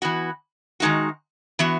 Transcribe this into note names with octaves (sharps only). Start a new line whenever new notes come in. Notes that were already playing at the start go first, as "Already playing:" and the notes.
E3 B3 F#4
D#3 G#3 D#4 F#4
E3 B3 F#4